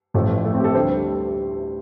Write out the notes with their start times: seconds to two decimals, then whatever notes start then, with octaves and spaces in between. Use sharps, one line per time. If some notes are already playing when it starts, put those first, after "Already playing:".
0.14 A1 A2 F3 A3
0.45 A3
0.54 C4
0.60 G4
0.64 A4
0.74 D2 D3 G3 C5